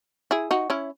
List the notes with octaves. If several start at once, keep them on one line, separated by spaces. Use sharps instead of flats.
E4 G#4
D#4 F#4
C#4 E4